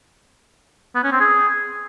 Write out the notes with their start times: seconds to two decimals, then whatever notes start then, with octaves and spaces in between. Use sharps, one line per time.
0.95 B3
1.04 C#4
1.12 C4
1.20 G#4